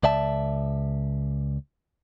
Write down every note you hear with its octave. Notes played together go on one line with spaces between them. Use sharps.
C#2 D5 E5 A5